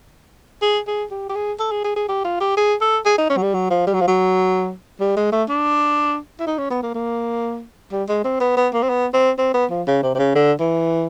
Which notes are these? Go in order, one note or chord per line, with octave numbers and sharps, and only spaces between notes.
G#4
G#4
G4
G4
G#4
A4
G#4
G#4
G#4
G4
F4
G4
G#4
A4
G#4
D#4
C#4
F#3
G3
F#3
F3
G3
F#3
F3
F#3
G3
G#3
A3
D4
E4
D#4
C#4
B3
A#3
A#3
G3
G#3
C4
B3
B3
A#3
C4
B3
C4
C4
B3
F3
C#3
C3
C3
C#3
D3
E3